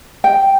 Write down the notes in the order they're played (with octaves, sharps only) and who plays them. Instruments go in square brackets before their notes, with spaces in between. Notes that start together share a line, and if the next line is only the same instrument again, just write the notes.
[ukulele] G5